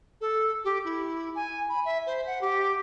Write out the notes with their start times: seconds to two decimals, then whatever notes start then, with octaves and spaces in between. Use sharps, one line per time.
0.21 A4
0.65 G4
0.84 E4
1.35 G#5
1.69 B5
1.85 E5
2.07 C5
2.26 F#5
2.41 G4